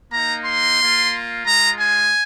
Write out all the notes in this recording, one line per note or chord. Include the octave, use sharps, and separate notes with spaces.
A#3 D#4 A#5
C6
A#3 F4
G#3 F4 A#5
G#5